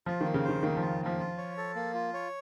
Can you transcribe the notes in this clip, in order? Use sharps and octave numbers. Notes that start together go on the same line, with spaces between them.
F3 F4
D#3 A#3
C#3
D#3 C5
D#3 A#3
F3 F4
F3 A#3
F4
C#5
A4
A#3
F4
C#5